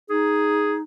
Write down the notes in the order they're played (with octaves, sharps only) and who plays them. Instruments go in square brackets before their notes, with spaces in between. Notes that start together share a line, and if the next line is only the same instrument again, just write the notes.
[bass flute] D#4 [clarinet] G#4